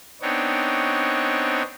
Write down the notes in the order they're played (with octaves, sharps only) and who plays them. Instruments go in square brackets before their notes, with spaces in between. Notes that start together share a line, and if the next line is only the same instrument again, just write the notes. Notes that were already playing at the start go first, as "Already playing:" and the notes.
[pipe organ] B3 C4 D4 D#4 C#5